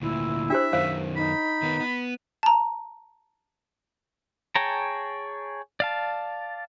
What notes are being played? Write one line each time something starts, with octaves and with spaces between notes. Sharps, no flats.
D2 A#2 E4
D4 G4 C5 E5
F#2 D#3 C5 F5
D#4 B5
D#3 B3
B3
A5 A#5
G#4 C#5 G5 A5 A#5
D5 F5 A5